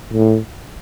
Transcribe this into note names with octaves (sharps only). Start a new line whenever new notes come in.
A2